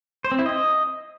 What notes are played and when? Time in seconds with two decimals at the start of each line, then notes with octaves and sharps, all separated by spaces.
0.24 C5
0.32 C4
0.39 E4
0.46 D#5